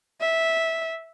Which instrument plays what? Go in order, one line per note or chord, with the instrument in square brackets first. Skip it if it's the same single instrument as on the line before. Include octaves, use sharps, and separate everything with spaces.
[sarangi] E5